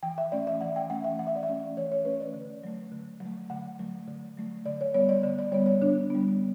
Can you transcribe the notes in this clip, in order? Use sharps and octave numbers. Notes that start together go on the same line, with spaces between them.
E3 G5
E5
A3 C#4 D5
E5
E3 F#5
G5
A3 C#4 F#5
E5
E3 F#5
E5
D5
E5
A3 C#4
E3 C#5
C#5
A3 C#4 B4
D5
D3
F#3 A3
D3
F#3
A3
D3 F#5
F#3 A3
D3
F#3 A3
D3 D5
C#5
G3 B3 C#5
D5
D3 D5
D5
G3 B3 C#5
C#5
D3 D4
G3 B3